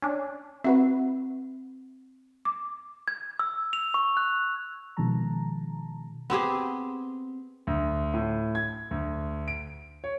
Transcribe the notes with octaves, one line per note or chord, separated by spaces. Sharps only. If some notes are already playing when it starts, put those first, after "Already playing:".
C#4 D4
C4 E4 F#4 B4
D6
G#6
E6
F7
C#6
F#6
B2 D#3 F3 G#3 A5 A#5
B3 C4 G4 G#4
D2
A2
G#6
D2
D7
C#5